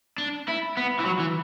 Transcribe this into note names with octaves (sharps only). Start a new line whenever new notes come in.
D4
E4
B3
E3
F#3
E3